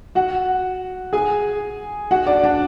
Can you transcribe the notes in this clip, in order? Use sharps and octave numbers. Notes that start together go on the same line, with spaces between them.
F#4 F#5
G#4 G#5
F#4 F#5
D4 D5
D4 D5